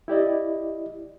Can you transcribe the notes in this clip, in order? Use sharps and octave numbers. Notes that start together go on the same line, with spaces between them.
E4 G4 D5 D#5